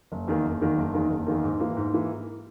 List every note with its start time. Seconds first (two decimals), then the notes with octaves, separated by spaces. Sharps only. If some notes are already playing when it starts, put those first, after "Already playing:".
0.12 F#1
0.28 E2 D#3 A#3
0.44 F#1
0.61 E2 D#3 A#3
0.78 F#1
0.94 E2 D#3 A#3
1.10 F#1
1.27 E2 D#3 A#3
1.44 G#2
1.60 E3 A#3
1.77 G#2
1.93 E3 A#3